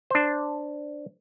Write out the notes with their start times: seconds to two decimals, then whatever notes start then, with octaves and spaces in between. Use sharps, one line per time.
0.10 D4 C5